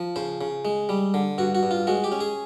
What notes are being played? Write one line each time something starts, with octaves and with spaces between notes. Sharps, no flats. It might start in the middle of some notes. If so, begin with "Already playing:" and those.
Already playing: F3
C#3 C5
C#3
G#3
G3
D3
G2 F#4
F#4
G2
F4
G#3 F#4
G4
C#4
G#4